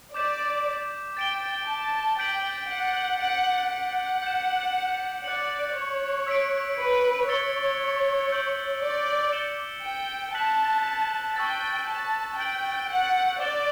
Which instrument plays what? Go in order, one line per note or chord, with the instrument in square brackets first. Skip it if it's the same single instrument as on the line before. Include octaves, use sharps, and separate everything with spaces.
[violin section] D5 [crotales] D6 G6 B6 E7
[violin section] G5 [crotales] A6 D7 G7
[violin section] A5
[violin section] G5 [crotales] G6 B6 D7 F#7
[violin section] F#5
[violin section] F#5 [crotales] G6 D7 F#7
[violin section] F#5
[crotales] G6 C#7 E7
[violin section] D5 [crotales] F#6 C#7 F#7
[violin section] C#5
[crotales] E6 B6 D7
[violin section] B4
[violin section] C#5 [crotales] E6 A6 C#7 G7
[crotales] E6 G6 D7 F#7
[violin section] D5
[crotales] G6 C#7 E7 G7
[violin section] G5
[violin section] A5 [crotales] F#6 B6 F#7
[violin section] G5 [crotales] C#6 E6 A6
[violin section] A5
[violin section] G5 [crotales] G6 D7 F#7
[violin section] F#5
[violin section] D5 [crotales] D6 A6 E7 G7